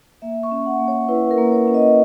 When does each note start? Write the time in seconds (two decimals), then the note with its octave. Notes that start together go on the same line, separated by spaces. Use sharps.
0.22 A#3 E5
0.43 C#6
0.51 C#4
0.66 F#5
0.79 A#3
0.88 C#5
1.08 E4 B4
1.31 A#4
1.37 A#3
1.52 C#5
1.68 C#4
1.74 D#5